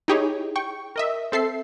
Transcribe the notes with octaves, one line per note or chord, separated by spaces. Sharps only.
D#4 E4 G4 G#4 C#5
G5 C#6
A#4 D#5 E5
C4 A4 E5 C7